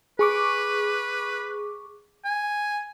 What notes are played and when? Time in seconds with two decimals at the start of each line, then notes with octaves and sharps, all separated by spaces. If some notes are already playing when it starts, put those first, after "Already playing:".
0.19 G#4 B4 C#6 D6
2.24 G#5